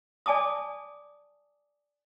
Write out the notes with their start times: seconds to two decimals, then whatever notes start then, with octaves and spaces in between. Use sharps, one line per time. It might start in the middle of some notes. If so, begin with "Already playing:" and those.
0.26 D5 G#5 A5 D6 D#6